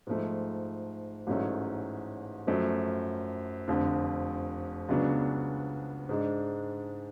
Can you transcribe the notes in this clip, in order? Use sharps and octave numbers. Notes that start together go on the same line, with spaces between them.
G#2 F3 A3
A1 G#2 F#3 A3 C#4
F#2 F3 A3
F1 F2 D3
C#2 C#3 F#3 B3 D4
G#2 G#3 D4